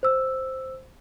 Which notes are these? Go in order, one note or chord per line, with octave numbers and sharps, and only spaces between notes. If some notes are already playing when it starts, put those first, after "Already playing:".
C5 E6